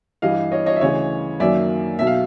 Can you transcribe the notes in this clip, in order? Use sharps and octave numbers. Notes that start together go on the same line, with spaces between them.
G2 E3 G3 D#5 F5
C#5 D#5
C#5 D#5
E5
D2 C#3 E3 C#5 D#5
F#2 D#3 F#3 A#3 D5 E5
B1 B2 F#3 E5
F5